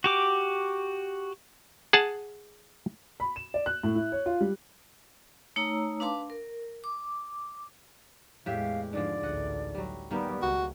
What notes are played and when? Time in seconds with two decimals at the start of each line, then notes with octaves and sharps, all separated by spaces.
0.04 F#4 G4 D6
1.93 G#4 F#5 A5
3.20 B5
3.36 E7
3.54 D5
3.66 F#6
3.83 A2
3.95 E4
4.12 C#5
4.26 F4
4.41 G3
5.56 A3 D#4 C#5 A#5 E6
6.00 D4 B4 F5 A5 C6 D6
6.30 A#4
6.84 D6
8.46 E2 A2 G#3 G4 E5 F5
8.93 G#2 D3 F3 D5
9.23 A1 D2 D#5 F#5
9.74 F#3 G3
10.11 D#3 G3 A#3 B3 G4
10.42 C#2 F#4